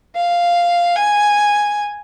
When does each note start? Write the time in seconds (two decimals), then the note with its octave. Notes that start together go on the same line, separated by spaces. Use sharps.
0.16 F5
0.96 G#5